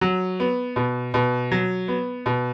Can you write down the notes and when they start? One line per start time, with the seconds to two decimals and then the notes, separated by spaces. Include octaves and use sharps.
0.01 F#3
0.40 B3
0.76 B2
1.14 B2
1.51 F#3
1.88 B3
2.26 B2